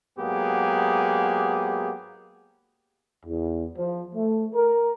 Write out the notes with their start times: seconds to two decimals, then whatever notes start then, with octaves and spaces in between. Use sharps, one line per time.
0.18 G#2 F#3 A#3 B3 G4 G#4
3.26 E2
3.77 F3
4.15 A3
4.55 A#4